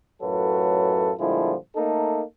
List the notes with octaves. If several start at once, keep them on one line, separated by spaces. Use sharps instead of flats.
F#2 A2 F#3 F4 A4 B4
A#2 D3 F3 G3 G#3 E4
A3 A#3 D#4 A4